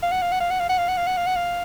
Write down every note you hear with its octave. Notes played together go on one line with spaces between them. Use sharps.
F5
F#5
F5
F#5
F5
F#5
F5
F#5
F5
F#5
F5
F#5
F5
F#5
F5